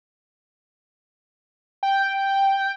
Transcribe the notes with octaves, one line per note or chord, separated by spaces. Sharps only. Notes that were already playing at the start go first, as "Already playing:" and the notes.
G5